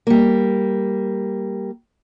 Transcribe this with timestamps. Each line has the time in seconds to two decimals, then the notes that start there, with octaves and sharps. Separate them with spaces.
0.07 G3 A#3